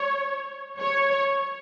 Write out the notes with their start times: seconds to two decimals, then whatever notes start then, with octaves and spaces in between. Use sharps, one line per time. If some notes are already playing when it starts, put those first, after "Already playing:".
Already playing: C#5
0.79 C#5